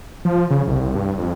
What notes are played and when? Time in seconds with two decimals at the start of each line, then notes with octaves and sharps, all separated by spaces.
0.25 F3
0.50 C#3
0.67 C2
0.95 G2
1.17 F2